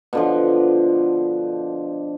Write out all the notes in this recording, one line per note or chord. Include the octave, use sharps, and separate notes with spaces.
B2 D3 F3